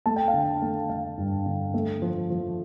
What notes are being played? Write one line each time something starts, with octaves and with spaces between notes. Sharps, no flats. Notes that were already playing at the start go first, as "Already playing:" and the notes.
A3 A5
G5
F5
D3
G5
A3
A3 F5
G2
D3
A3
F3
F3